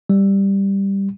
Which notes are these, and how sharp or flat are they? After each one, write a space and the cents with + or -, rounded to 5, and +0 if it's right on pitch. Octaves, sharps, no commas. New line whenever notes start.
G3 +5